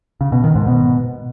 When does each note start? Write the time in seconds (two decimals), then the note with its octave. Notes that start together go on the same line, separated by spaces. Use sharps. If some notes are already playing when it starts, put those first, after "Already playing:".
0.21 C#3
0.32 B2
0.44 D#3
0.55 G#2
0.67 B2